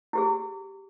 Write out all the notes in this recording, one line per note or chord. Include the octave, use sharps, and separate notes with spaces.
E4 G4 G#4